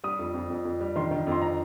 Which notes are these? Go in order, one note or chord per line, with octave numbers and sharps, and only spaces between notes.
G3 D#6
F2
F2
F2
F2
G3
D#3 C6
D#3
F2
C6
A#5